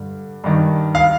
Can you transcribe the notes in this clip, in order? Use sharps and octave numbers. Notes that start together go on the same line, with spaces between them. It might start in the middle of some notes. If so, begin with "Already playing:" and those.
Already playing: G2 D3
G2 D#3
F5